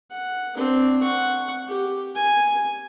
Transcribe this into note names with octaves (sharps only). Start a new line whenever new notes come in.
F#5
C4 D4
F#5 C#6
G4
G#5